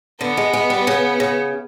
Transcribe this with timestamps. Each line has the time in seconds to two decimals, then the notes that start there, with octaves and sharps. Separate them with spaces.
0.21 D3 B3
0.37 G#3
0.53 G#3
0.70 G3
0.87 C#3
1.20 C#3